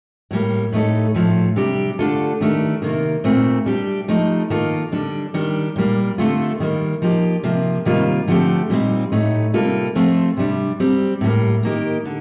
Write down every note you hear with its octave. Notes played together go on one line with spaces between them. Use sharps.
A2 G3 A#3
A2 A3 D#4 A4
A2 F3 A3
C3 G3 D4 G4
D3 A3 D4 F4 A4
D#3 A3 D4 G4
C3 D#3 A#3
A#2 A3 C4
G3 D4 G4
F3 A3 D#4
D#3 A#3 F4 A4
D3 G3 D4
D#3 G3 D4 G4
A#2 G3 A#3
D3 A3 C4 F4
D#3 G3 A#3
F3 A#3 D#4 G4
C3 F3 A#3
C3 D#3 G3 A#3 F4
D3 F3 A3 C4 G4
A#2 G3 C4 D#4
A2 A3 D#4
C3 G3 A#3 F4 A4
F3 A3 C4 F4
C3 G3 D4
G3 C4 G4
A2 G3 A#3
D#3 A#3 D#4 G4
D3